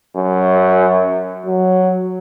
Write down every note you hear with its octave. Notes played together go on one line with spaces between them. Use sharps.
F#2
F#3